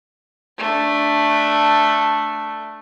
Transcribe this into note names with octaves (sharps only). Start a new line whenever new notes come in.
A3 D4